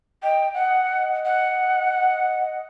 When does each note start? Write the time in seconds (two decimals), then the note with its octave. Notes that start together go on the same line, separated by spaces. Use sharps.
0.23 D#5 G5
0.54 D#5 F#5
1.25 F#5